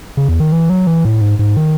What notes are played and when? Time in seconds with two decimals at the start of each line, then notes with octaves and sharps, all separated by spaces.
0.17 C#3
0.28 E2
0.40 D#3
0.52 E3
0.70 F#3
0.87 E3
1.05 A2
1.21 G#2
1.39 G#2
1.57 D#3